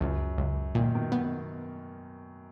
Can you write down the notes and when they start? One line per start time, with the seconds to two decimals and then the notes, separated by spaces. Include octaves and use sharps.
0.01 C#2 F#2
0.38 C#2
0.75 A#2 D#3
0.95 B2 D#3
1.12 B3